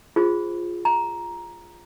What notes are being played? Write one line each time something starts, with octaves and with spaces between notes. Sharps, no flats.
F4 G#4 C5
A#5